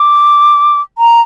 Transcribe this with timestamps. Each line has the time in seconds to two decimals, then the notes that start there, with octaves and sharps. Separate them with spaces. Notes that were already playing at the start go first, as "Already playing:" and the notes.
Already playing: D6
0.98 A#5